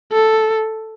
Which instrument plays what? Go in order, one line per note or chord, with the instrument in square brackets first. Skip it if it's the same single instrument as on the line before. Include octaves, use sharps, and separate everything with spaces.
[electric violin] A4